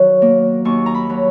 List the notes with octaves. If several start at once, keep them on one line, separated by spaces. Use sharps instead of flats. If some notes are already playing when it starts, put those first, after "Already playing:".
Already playing: D#3 F#3
A#3
D#2 C#6
A#5
B5
F#3